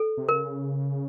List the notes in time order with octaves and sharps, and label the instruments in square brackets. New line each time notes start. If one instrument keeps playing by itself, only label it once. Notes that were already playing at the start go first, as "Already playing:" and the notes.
Already playing: [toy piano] A4
[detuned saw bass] C3
[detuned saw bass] C#3 [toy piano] A#4